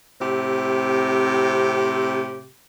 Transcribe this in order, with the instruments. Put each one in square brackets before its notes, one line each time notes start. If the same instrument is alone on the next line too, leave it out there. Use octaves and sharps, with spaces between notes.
[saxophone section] A2 C3 C4 G4